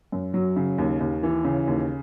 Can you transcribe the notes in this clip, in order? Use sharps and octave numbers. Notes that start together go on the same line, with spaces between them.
F#2
F#3
C#3
D#2
D#2
E3
C#3
D#2